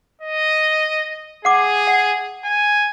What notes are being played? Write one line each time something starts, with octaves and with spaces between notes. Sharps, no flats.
D#5
G#4 F#5 D6
F#5
G#5